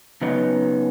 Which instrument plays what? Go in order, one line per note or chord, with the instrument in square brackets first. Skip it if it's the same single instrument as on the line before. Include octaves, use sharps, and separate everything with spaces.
[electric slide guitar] C#3 F#3 B3 D#4